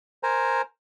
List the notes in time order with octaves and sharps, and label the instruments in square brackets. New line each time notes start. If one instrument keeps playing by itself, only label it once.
[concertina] A#4 C5 G#5 A#5